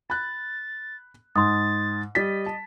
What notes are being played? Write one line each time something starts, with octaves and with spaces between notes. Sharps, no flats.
B5 F#6 A6
G#2 C6 D#6 A6
G3 D#5 A6 B6
A5